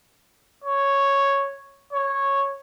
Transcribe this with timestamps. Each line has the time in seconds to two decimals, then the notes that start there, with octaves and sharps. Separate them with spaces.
0.64 C#5
1.93 C#5